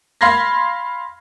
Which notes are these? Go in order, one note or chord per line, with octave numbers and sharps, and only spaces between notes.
F5 B5 C6 G#6 A#6